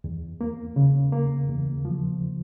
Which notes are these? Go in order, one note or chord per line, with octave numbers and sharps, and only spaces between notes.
E2
A#3
C#3
A#3
E2
F3